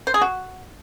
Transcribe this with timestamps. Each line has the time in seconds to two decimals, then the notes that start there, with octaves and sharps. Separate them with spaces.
0.07 C5
0.14 G#4
0.21 F#4